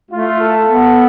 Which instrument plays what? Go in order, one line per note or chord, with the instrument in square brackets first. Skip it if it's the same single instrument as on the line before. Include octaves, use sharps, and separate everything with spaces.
[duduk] A3 [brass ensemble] F4
[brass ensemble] A4
[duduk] B3